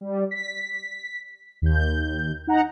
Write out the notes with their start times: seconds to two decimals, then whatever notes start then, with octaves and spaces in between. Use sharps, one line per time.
0.01 G3
0.31 B6
1.62 D#2 G6
2.47 D#4 F#5 A#5